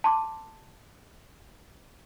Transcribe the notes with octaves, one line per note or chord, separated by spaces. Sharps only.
A5 C6 D6